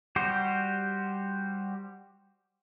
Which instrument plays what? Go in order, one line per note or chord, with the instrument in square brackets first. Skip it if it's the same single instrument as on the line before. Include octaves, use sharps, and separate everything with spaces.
[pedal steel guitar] G3 F#4 G4 C5